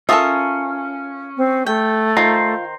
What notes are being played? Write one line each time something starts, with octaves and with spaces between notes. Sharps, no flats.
C#4 F4 A4 A#4 E5 D#6
C4
A3 G5
D#3 F4 C5 A#5